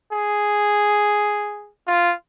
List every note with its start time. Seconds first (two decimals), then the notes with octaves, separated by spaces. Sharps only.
0.12 G#4
1.87 F4